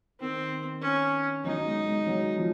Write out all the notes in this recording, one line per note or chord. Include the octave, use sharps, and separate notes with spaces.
D#3 C4
C#4
F#3 D#4
G#3
G#3
F#3
F3